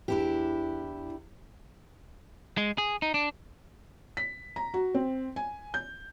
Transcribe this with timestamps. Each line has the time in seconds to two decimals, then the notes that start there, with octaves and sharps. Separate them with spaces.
0.08 E2 D4 E4 G4
2.57 G#3
2.78 G#4
3.02 D#4
3.14 D4
4.17 B6
4.56 A#5
4.74 F#4
4.95 C4
5.36 G#5
5.74 G6